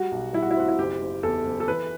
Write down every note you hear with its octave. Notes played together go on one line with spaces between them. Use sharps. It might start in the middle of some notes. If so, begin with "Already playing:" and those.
Already playing: G3 F#4
B1
G3 E4
F#4
E4
C4 F#4
E4
F#1 G4
F#1
E2 A4
F#1
A4
E3 B4